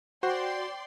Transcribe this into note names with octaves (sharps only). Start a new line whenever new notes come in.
F#4 C5 D5 G5 C6